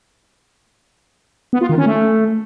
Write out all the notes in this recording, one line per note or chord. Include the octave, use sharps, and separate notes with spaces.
B3
F4
D#3
C#4
A3